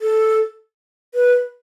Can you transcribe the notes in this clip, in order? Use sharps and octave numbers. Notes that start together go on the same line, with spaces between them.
A4
B4